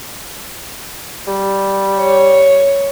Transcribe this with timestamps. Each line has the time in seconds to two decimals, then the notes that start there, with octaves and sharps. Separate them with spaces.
1.27 G3
1.97 C#5